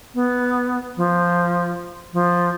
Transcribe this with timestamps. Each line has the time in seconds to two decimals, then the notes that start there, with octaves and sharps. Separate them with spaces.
0.15 B3
0.97 F3
2.13 F3